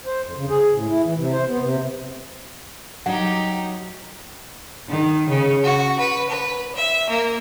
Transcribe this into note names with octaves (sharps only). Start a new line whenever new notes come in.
C5
F2
C#3
G#4
A2
E4
E3
C3
C5
B3
C3
F#3 D#4 G4 F#5
D#3
C#3
F#4
B4
B4
E5
A#3